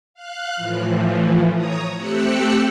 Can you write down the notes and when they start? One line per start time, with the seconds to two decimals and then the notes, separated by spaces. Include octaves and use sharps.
0.14 F5 F#6
0.56 A2 E3 F3
1.54 C#5 A#5 D#6
1.95 A3 C4 G4 E6 F#6 C#7